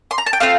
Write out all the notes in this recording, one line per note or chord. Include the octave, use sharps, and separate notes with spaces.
C6
A#5
A5
G5
A3 C4 F4 F5